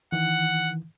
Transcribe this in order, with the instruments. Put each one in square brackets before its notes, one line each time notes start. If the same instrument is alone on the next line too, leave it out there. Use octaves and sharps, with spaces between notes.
[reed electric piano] D#3 E3 [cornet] F#5